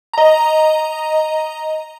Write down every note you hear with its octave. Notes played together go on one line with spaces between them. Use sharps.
D#5 A#5